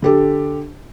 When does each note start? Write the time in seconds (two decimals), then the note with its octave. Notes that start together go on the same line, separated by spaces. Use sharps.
0.02 D3 G4 A4